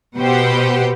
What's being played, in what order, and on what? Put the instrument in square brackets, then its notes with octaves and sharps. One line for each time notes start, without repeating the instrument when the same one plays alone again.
[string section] B2 G4 B4 C5 F#5 G5